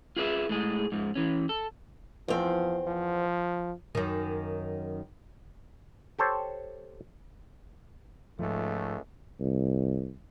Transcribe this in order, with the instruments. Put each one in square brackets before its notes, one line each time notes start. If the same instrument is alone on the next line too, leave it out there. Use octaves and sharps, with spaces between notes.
[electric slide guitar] F4 G#4 B4 D5 E5
A2 G#3 G#4
G#2 F3
E3 C#4
A4
[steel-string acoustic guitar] E2 C4 [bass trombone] F3
[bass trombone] F3
[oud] F#2 D#3
[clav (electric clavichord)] G4 A4 C5 C#5
[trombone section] C#2 A3 [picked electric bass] G#2 F3
[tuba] C2